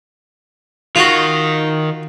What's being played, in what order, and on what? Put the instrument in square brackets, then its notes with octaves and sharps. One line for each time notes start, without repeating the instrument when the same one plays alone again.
[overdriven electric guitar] D#3 [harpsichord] F4 F#4